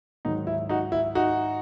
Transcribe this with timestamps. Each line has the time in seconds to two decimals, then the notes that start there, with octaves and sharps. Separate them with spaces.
0.25 G#2 D#3 F#3 D#4
0.47 E4
0.69 D#4 F#4
0.92 E4
1.15 D#4 F#4